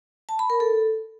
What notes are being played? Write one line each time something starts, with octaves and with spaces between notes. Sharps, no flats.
A5
B5
A#4
A4